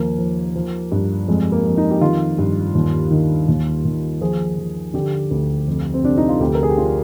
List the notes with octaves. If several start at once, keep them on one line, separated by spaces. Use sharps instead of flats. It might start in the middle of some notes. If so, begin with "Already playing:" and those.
Already playing: D#2 F3 A#3
F3
F3
G2
F2 G#3
A#3
F2
D#4
G4
D#3 F4
G2
D#2
D#3
D#2
D#2
F3 G#4
F3
D3 G4
D2
F2
C4
C3 D4
D#4
F4
D2 G4
A#4
G#4
G4
D3 F4